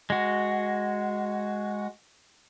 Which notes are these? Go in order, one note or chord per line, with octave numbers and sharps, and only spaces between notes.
G#3 F#4